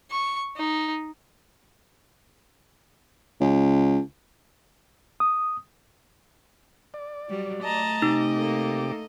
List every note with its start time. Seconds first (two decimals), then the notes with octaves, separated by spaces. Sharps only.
0.11 C#6
0.57 D#4
3.41 C#2
5.20 D#6
6.94 D5
7.29 F#3 G3
7.64 A3 D#5 A5 A#5
8.02 C3 D#4 G4 D6
8.34 A#3 A4